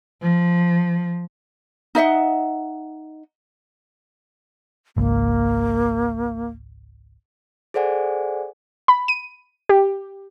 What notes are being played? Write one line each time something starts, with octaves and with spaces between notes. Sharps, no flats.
F3
D#4 D#5 E5 F#5
G#1 C#2 G#2 A#3
G#4 A4 C5 D5 F#5 G#5
B5
D#7
G4